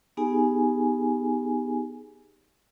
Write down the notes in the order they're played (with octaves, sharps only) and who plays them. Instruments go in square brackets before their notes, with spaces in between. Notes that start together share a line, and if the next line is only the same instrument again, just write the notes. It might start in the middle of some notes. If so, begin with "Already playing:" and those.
[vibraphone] B3 D#4 G4 G#4 G#5